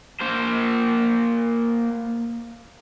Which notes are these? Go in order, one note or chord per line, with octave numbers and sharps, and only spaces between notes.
A#3 C5